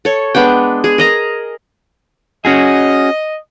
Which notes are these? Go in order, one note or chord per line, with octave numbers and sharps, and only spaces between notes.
A4 C#5
G#3 B3 D4 G5
G#4
A#4 D#5 A#5
C#4 F#4 G#4 D#5